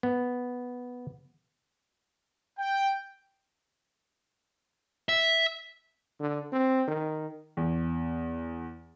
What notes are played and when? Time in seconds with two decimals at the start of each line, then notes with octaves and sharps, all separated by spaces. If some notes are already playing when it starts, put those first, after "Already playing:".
0.03 B3
2.58 G5
5.09 E5
6.20 D3
6.53 C4
6.88 D#3
7.57 E2